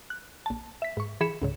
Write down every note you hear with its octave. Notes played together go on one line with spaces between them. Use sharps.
F#6
A#1 A5
E5 B6
G#2 C#6
E3 G#4 B5 B6 C#7 E7
C#2 G#2 C#3